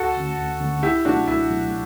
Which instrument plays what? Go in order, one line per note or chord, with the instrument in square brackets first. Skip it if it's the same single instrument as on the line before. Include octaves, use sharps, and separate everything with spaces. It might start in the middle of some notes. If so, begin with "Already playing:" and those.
Already playing: [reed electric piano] D2 [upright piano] F#4 A4
[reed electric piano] D3 A3 C#4
D2
D3 A3 C#4
[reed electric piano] C#2 [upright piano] E4 G4
[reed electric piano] B2 F#3 A3 [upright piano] D4 F#4
[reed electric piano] C#2 [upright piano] E4
[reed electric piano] B2 F#3 A3